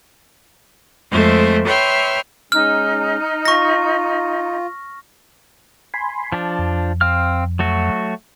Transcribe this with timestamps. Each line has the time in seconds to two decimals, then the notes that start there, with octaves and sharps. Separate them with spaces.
1.11 F2 G#3 A3 C4 C5 E5
1.66 B4 C#5 E5 G5 C6 F6
2.52 G#3 C#4 D#4 F6
3.45 F4 C#6 A#6
5.94 G#5 B5 C6
6.32 F3 D4
6.59 F2
7.01 C4 F5 F6
7.59 F#3 A3 F#4